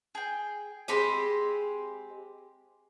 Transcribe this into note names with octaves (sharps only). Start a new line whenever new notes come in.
G#4 G5
G#3 C4 G4 G#5 B5 C6